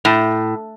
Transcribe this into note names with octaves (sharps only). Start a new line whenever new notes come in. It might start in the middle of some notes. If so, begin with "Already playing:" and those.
A2